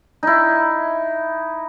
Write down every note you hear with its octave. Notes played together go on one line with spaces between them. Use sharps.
D#4 E4